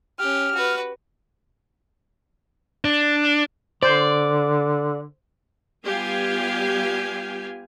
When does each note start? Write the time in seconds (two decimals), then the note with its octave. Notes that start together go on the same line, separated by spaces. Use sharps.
0.19 C#4 G4 F6
0.54 F#4 B4
2.85 D4
3.83 D3 C5 D5
5.86 G3 B3 F4 G4 F5 G#5